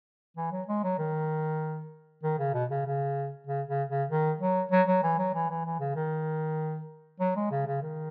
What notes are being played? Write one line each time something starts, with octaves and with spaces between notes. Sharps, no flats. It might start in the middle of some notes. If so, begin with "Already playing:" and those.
E3
F#3
G#3
F#3
D#3
D#3
C#3
B2
C#3
C#3
C#3
C#3
C#3
D#3
F#3
F#3
F#3
E3
F#3
E3
E3
E3
C#3
D#3
F#3
G#3
C#3
C#3
D#3